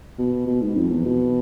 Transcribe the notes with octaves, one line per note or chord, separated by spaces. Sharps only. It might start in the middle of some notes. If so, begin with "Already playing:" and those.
B2
B2
G#2
F2
E2
B2